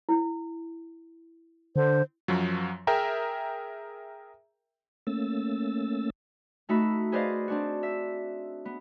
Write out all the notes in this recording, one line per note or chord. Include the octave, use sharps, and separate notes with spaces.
E4
D3 C5
F#2 F3 F#3
G#4 A#4 E5 G5 A#5
A3 A#3 C#4 E6 A6
A3 D#4 F#4 E5 B5
G#4 B4 C5 D5 D#5 F5
C4 D4 F#4
E5
B3